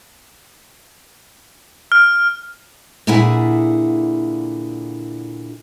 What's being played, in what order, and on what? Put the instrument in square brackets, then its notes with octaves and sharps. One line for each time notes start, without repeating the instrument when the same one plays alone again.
[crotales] F6
[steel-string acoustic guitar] A#2 D3 E4 G#4 E5 F#5